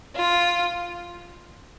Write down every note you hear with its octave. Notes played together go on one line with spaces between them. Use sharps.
F4